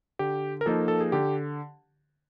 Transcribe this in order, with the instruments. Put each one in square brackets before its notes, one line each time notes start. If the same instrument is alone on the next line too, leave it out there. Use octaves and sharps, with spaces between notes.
[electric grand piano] D3 G4
A#4
F3 A#3 D#4 A4
A4
G#4
D3 G4